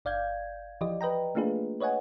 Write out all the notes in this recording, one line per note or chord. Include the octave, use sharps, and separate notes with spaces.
G1 D5 F5 G6 G#6
E3 F3 G4 D5 D#5
B4 D#5 G5 A#5
A3 A#3 D4 F4 G#4 B4
B4 C#5 D#5 F#5 G#5